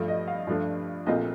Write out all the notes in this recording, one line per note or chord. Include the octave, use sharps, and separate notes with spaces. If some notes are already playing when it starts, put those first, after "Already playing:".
Already playing: G2 F3 A3
D#5
F5
G2 F3 A3 D4 F4
A#1 A#2 A3 C4 F4 D#5